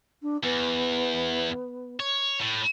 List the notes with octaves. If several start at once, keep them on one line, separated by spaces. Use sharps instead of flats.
D4
E2 B3
C#5
A2